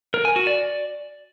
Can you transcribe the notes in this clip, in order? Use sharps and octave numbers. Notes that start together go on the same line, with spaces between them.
A#4
G#5
F#4
D5